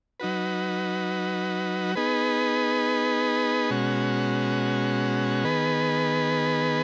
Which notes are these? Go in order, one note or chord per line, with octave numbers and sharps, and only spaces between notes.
F#3 D#4 F#4 B4
B3 D#4 G#4 B4
B2 G#3 C#4 F#4
D#3 B3 G#4 B4